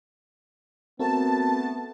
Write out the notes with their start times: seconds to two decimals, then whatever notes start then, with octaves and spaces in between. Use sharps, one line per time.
0.99 A3 B3 C4 F#4 A#4 A5